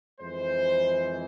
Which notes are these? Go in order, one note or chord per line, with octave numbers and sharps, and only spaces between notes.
F2 E3 G#3 C5